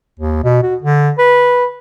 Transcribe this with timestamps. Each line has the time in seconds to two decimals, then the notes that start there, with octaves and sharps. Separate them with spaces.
0.20 D#2
0.44 B2
0.63 F#4
0.82 D3
1.18 B4